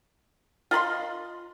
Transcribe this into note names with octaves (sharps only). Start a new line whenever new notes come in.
F4 D#5 B5 C6